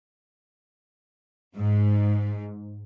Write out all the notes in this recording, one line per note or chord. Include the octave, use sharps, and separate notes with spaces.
G#2